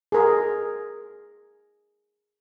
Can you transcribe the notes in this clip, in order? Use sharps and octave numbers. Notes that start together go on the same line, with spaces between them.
G#4 A#4